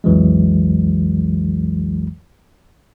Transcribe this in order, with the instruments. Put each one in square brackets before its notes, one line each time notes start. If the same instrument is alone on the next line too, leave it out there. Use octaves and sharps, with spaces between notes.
[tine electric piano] B1 F2 E3 F#3 G#3